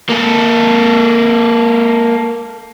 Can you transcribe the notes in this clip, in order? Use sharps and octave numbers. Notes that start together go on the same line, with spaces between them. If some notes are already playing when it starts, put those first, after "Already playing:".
A#3 A4